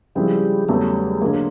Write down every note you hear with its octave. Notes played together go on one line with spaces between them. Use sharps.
C#3 F3 G3 G#3 C4 E4
E2 C#3 F#3 G3 A3
D3 F#3 G#3 A#3